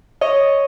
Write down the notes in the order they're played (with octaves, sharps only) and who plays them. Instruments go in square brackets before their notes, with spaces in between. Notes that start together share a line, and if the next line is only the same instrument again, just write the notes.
[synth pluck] C#5 D#5